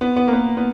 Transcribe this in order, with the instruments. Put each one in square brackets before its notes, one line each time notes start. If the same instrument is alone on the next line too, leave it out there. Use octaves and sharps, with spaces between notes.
[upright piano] B3
B3
A#3
B3
B3